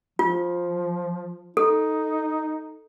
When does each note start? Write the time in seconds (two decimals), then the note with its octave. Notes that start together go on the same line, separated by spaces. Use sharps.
0.19 F3 F4
1.57 D#4 A4